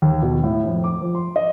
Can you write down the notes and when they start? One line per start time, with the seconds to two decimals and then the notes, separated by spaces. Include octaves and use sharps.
0.02 D#2
0.22 B2
0.44 A2
0.67 F2
0.84 D6
1.01 F3
1.15 C6
1.36 D#5